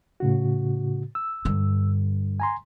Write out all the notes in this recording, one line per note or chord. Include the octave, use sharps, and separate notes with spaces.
A2 C#3 F#4
E6
G2 D3
G#5 A#5 C6